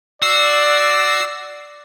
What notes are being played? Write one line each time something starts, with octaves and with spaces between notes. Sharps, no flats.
F#4 D5 E6 C7